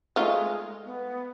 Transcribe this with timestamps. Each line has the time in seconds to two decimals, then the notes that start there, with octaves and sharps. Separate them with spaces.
0.16 G#3 A3 D#4 F4
0.85 B3